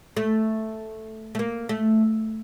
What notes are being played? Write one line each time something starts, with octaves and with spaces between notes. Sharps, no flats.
A3
A3
A#3
A3